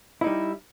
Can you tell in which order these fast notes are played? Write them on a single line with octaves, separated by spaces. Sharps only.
E4 D#4 G3